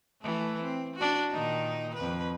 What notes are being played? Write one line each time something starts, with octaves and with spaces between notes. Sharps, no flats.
E3 A3
C4
D4 F#4
A#2 D#3 D#4
F2 B4